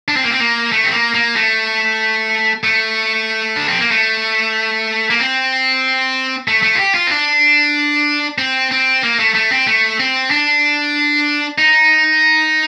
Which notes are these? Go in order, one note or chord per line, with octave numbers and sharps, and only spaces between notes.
D4
C4
A#3
C4
A#3
A3
C4
A#3
A#3
A3
A3
D4
C4
A#3
A3
A#3
C4
A3
A3
F4
G4
F4
C4
D4
C4
C4
A#3
A3
A3
C4
A3
C4
D4
D#4